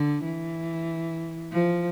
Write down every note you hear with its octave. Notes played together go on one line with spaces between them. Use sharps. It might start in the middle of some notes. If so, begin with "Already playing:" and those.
Already playing: D3
E3
F3